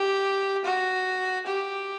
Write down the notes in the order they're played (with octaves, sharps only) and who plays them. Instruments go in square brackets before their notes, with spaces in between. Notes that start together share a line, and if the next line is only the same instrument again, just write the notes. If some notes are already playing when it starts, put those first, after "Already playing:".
Already playing: [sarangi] G4
F#4
G4